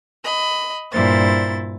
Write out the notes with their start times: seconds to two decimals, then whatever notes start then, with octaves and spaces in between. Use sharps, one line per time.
0.23 D#5 B5
0.92 G2 A#2 E4 C5 A6